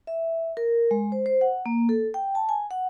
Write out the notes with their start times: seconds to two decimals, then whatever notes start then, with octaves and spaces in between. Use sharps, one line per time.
0.07 E5
0.57 A#4
0.91 G#3
1.12 C5
1.26 C5
1.41 F#5
1.66 A#3
1.89 A4
2.14 G5
2.35 A5
2.49 G#5
2.71 F#5